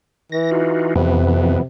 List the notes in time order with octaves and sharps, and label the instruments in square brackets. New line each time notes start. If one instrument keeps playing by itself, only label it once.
[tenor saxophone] E3 [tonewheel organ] A#6
[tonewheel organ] D#4 F4 F#4
[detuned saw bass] F2 [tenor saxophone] C3 [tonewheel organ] E3 B3